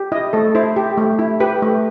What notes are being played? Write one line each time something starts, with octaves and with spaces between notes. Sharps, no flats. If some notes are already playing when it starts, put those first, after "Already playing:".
Already playing: G4
E4 D#5
A3 A4
E4 C5
G4
A3
E4
G4 B4
A3